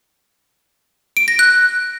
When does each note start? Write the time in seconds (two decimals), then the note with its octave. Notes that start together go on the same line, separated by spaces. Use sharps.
1.17 D7
1.28 A#6
1.39 F#6